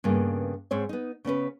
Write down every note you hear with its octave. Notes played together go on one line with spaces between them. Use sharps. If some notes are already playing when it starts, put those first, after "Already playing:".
G2 C#3 A#3 B3
G#2 C4 C#5
B3 D#4
C#3 B3 C#4 B4